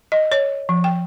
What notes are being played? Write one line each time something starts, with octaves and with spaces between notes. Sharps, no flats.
D#5
C#5
F3
G5